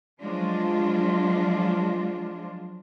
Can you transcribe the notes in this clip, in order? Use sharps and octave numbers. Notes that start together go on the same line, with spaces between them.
F3 F#3 G#3 D4 F4